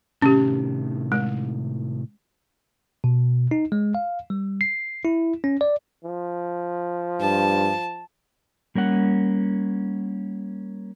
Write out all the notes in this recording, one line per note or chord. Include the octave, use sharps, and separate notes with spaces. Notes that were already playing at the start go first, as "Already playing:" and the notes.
A2 C3 D#3 C#4 G4
G#3
B2
D#4
G#3
F5
G3
C7
E4
C#4
D5
F3
G2 A5
G3 A#3 C#4 F#5